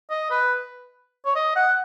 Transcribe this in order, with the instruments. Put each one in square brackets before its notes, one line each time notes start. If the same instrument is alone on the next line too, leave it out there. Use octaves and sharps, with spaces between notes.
[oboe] D#5
B4
C#5
D#5
F#5